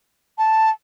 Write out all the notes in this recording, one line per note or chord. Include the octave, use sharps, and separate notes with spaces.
A5